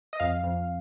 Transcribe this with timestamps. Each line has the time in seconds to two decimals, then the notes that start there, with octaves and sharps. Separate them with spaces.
0.13 D#5
0.20 F2 F5
0.44 F2